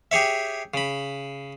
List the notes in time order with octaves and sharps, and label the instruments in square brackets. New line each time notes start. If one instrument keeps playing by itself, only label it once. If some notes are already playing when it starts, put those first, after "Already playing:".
[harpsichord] G4 G#4 C#5 E5
C#3 B5